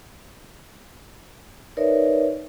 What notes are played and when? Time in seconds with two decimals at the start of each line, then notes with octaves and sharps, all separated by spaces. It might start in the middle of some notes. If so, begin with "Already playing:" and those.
1.77 D#4 A#4 B4 C#5 D5 E5